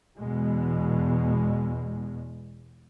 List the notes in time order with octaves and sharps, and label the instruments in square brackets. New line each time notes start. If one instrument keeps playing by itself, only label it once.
[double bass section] E2 B2 G#3